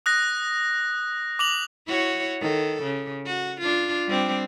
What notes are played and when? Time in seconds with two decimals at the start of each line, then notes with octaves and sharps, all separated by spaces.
0.06 D#6 F#6 A#6
1.39 D6 F7 F#7
1.87 E4 F#4 C#5
2.41 D#3 A4
2.83 C#3
3.26 F#4
3.61 D4 F4
4.08 G3 C4 D4